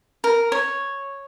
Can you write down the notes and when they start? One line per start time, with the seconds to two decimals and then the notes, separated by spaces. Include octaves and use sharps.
0.24 A#4
0.52 C#5